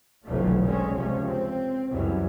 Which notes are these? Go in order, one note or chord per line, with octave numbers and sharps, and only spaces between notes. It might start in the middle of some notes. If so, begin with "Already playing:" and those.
F1 B1 D3 E3 F3 A3
D3 G#3 C4 C#4
C#2 C3 F3 C#4
C4
C#2 F#2 C3 E3 F#3 G3